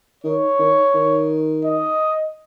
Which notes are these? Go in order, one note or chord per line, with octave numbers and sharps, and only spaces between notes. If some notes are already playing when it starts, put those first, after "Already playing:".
D#3 C#5
D#3
D#3
D#5